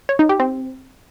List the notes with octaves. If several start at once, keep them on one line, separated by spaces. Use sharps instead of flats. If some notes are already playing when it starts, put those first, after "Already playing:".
C#5
D#4
G4
C4